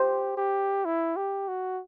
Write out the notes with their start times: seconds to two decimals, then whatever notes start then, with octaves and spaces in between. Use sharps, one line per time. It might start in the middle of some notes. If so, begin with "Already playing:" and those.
Already playing: G4 C5
0.37 G4
0.85 E4
1.17 G4
1.48 F#4